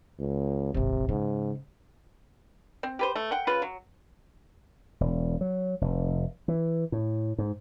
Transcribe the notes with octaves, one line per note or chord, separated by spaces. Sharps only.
C#2
D#1 G#1 C3
G#2 C#3
C4
G4 B4 C5
A3
F#5 G5
C#3 F4 B4
F#3
E1
F#3
F1
E3
A2
G#2